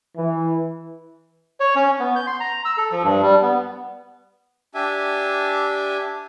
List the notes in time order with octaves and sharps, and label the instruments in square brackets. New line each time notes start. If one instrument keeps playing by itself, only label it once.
[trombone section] E3
[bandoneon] C#5
C#4
B3
G6
C6
A#5
E6
A4
F3
G2
G3
B3
[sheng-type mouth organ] D4 G4 E5 G#5